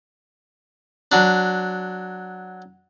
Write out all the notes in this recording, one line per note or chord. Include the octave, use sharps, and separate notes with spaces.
F#3 D4